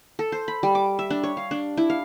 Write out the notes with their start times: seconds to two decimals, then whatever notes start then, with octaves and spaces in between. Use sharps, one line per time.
0.19 A4
0.32 C5
0.48 B5
0.63 G3
0.75 D6
0.99 E5
1.10 D4
1.23 C#5
1.37 F5
1.51 D4
1.77 E4
1.90 F5